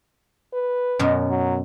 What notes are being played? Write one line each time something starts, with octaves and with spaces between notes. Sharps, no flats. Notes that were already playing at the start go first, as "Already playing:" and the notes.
B4
F#2 B2 A#4
F#3